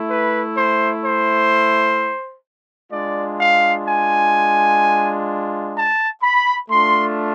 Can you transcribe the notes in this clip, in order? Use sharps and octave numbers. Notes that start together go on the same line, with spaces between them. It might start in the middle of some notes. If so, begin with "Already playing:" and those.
Already playing: A3 E4
B4
C5
C5
G#3 D4 F4 D5
F5
G#5
A5
B5
A3 D4 F4 C6